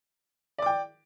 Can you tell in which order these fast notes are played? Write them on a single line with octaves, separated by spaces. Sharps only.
D5 D6 G5